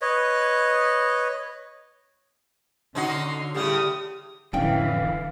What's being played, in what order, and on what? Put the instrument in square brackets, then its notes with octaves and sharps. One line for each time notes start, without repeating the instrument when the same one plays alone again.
[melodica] B4 C#5 D#5
[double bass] D3 [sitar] C#4 D#4 F#4 [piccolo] C6
[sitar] A2 C#3 G3 [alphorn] G4 [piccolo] D#6
[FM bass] D1 [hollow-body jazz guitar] F2 C#4 G5 [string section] D3 E3 [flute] F5